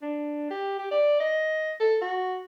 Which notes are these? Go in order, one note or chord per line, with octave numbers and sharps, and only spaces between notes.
D4
G4
G4
D5
D#5
A4
F#4